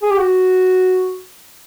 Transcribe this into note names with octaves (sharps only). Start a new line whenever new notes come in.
G#4
G4
F#4